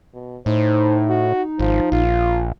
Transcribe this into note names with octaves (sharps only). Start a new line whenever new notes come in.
B2
A2 D#4 C5
F#4
G#1 F3
A#1 F4